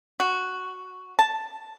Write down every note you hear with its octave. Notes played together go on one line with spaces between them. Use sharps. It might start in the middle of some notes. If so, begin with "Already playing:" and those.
F#4
A5